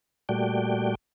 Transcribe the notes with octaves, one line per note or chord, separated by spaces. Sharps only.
A#2 G3 A3 F#4 D5 G5